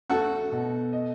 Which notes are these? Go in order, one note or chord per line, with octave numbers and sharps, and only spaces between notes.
A3 F#4 A4
B2
D#5